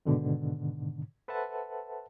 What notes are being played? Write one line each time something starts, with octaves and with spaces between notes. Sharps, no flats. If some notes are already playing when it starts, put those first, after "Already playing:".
G#2 B2 D3 D#3
A4 B4 C5 E5 F#5 A5